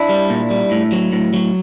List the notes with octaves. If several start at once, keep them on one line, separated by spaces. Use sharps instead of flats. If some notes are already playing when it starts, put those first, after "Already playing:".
Already playing: D4 E4
G3
A#2
G3
A2
F#3
A2
F#3